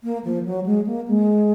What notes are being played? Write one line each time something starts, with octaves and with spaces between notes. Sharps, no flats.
A#3
F3
F#3
G#3
A#3
G#3